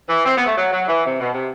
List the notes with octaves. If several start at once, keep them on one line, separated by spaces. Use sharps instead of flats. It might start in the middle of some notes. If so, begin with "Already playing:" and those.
E3
C4
B3
A3
F#3
F#3
E3
C3
B2
C3